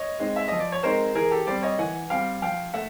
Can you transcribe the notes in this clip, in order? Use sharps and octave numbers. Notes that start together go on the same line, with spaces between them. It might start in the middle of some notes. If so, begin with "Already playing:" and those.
Already playing: C#5 D#5
G#3 C4 D#4
E5
F3 D#5
D5
C#5
G#3 C4 D#4 A#4 C5
E3 G#4 A#4
G4 A4
G3 C4 C5 D5
C#5 D#5
E3 F#5 G#5
G3 C4 F5 G5
F3 F5 G5
A3 E5 F#5